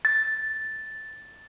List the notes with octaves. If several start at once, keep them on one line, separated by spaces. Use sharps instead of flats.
A6